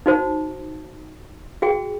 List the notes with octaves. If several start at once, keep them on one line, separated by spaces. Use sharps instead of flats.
D#4 F#4 C5 A5
F#4 G#4 G5